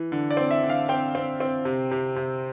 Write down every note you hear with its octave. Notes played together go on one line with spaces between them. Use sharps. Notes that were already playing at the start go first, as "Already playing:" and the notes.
Already playing: E3
D3
D5
C4
E5
D3
F5
C4 G5
C4
C4
C3
C3
C3